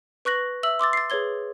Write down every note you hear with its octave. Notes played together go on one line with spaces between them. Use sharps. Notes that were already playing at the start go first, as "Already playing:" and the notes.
B4 C#6 F#6 A#6 F#7
E5 E6 F#7
C6 D6 E6 A6
A6 C7
G#4 B4 C#5 G#6 G7